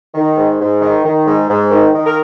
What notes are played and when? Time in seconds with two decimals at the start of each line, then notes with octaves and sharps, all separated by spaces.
0.15 D#3
0.37 G#2
0.60 G#2
0.82 D#3
1.05 D#3
1.26 G#2
1.49 G#2
1.71 D#3
1.94 D#3
2.06 A#4